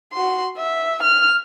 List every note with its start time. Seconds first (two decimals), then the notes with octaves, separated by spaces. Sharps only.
0.13 F#4 C6
0.57 E5
1.03 F6